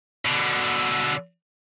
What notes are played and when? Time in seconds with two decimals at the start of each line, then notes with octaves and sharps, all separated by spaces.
0.25 B2 D3